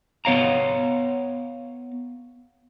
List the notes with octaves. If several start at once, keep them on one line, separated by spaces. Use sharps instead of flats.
B3 C#5 F5 A#5